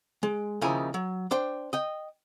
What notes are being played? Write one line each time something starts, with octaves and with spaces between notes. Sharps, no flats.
G#3
D#2 C#3 F3 E4 A#4 G#5
F#3
D4 C5 G5
D#5 G5